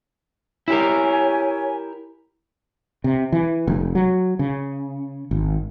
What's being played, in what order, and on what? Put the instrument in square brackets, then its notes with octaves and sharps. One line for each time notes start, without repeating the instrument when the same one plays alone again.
[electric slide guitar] E4 G4 A#4 [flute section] C#5 G#5
[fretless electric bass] C3
E3
F1
F#3
C#3
G#1